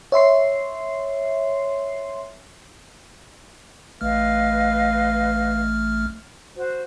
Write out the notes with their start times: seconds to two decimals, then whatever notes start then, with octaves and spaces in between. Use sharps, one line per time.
0.12 C#5 E5 C6 C7
4.01 A1 A3 B4 D#5 F5 F6
6.57 F#4 C5